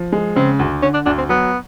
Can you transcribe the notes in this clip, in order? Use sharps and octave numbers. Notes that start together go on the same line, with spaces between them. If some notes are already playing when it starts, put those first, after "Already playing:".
Already playing: F3
G#3
C#3 C4
D2
D3 C#4
D4
D2 D4
C4
F#3 B3